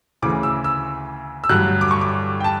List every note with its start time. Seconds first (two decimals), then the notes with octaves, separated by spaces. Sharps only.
0.22 D2 C#3 E3 D6
0.43 E6
0.64 E6
1.44 E6
1.49 A1 G2 D3 F#3 F#6
1.81 D6
1.91 C#6
2.01 D6
2.40 G5
2.44 A5